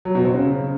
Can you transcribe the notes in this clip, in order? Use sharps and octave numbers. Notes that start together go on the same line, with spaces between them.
F#3
B2
C4
C#3